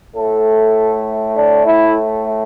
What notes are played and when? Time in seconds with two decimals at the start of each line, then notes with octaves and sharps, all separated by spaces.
0.16 A2 A3 A4
1.36 D4
1.67 E4